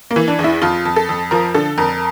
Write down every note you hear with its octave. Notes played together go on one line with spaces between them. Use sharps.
A#3
E3
D4
E2
E4
F2 F4
F2
A4
F2
F3 A#4
D3 A4
F2 A#4